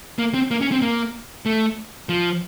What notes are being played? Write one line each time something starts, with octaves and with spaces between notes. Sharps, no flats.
A#3
C4
A#3
C#4
C4
A#3
A3
F3